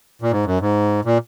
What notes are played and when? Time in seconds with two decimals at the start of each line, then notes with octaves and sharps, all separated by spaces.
0.22 A#2
0.32 G#2
0.45 F#2
0.61 G#2
1.05 A#2